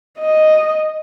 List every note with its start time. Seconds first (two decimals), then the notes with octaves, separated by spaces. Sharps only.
0.19 D#5